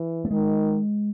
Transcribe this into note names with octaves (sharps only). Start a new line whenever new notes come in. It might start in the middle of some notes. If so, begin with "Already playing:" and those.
Already playing: E3
A3
D#3 G#3